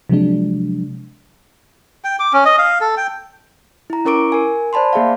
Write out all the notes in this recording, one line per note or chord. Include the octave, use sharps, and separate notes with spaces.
C3 F3 F#3 G#3 D4
G5
D6
C#4
D#5
F5
A4
G5
E4 A#5
C#4 E4 A#4 C#6 D6 D7
A#4 G#5
C5 D5 A5 B5 C6
A#3 G#4 E5 F5